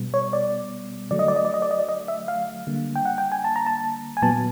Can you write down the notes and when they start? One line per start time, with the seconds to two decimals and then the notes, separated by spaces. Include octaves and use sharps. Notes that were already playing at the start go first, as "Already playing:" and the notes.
Already playing: B2 G3 B3
0.14 C#5
0.33 D5
1.11 D3 F#3 A3 D5
1.19 D#5
1.28 D5
1.36 D#5
1.45 D5
1.54 D#5
1.62 D5
1.71 D#5
1.79 D5
1.89 D#5
2.08 E5
2.28 F5
2.67 D3 G3 A#3
2.95 G5
3.05 F#5
3.18 G5
3.32 G#5
3.44 A5
3.56 A#5
3.66 A5
4.17 G#5
4.22 A#2 F#3 B3 A5